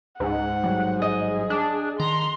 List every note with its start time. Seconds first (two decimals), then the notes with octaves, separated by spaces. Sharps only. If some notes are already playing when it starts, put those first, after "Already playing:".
0.20 C#2 G#2 F#5
0.64 A1 F#3 G3
1.02 G#4 D#5
1.50 D4
2.00 D#3 A#5 C6